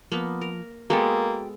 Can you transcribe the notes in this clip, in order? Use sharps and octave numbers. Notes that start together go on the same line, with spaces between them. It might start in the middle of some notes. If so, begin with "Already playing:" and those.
F3 A#3 B3
A#4
G#3 A#3 B3 F#4 A4 F#5 G5